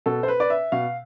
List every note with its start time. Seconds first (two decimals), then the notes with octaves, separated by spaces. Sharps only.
0.06 B2 A4
0.23 C5
0.28 B4
0.40 D5
0.50 E5
0.72 B2 F5